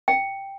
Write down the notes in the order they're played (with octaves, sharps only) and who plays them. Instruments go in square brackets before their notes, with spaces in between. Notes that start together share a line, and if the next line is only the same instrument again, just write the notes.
[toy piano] G5